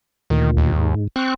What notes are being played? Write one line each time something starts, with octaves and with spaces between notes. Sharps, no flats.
D2 A#2 D#3
D#2
G#2
C4 C#6 F#6